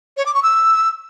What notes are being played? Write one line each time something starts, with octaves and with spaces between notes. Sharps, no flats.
C#5
D6
C#6
E6